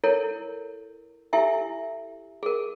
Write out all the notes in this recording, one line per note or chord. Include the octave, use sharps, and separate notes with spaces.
E4 A4 A#4 C#5
E4 G4 A4 E5 G#5
G#4 A#4